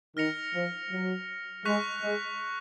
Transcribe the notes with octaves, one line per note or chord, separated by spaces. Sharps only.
D#3 F6 A#6 C#7 F7
F3
F#3
G#3 C#6 F#6 B6 F7
G#3